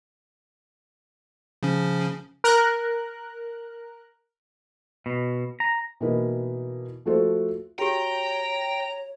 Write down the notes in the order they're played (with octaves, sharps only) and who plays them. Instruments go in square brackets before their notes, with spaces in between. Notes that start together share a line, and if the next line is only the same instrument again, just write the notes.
[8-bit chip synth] C#3 F3 C#4
[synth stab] A#4 F#6
[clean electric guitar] B2
A#5
[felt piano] B2 E3 A#3 D#4 A#4 B4
F3 A3 F#4 A4 C5
[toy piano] F#4 G4 [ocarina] C#5 [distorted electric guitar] G5 [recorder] A#5